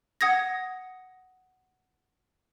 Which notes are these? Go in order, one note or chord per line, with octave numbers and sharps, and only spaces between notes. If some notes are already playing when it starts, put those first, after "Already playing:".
F#5 D#6 G#6 A#6